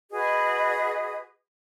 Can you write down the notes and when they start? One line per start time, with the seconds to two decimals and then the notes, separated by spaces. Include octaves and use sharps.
0.11 F#4 G#4 B4 D#5